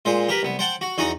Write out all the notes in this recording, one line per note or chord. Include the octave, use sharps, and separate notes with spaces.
A#2 G#3 C5
G4 A#4 B4
C2 B3
C5 F#5 G5 A5
F#4
E2 D#4 F#4 G#5 D#6